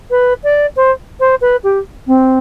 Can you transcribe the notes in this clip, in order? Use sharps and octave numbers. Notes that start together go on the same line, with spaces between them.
B4
D5
C5
C5
B4
G4
C4